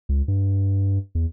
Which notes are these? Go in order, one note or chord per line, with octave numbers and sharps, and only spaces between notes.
C#2
G2
E2